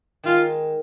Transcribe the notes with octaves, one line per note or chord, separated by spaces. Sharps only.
D#3 G#3 F4